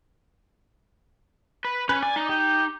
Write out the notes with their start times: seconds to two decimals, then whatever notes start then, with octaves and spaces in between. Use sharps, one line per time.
1.65 B4
1.89 C#4 B4
2.03 D5 G#5
2.16 D#4
2.29 G4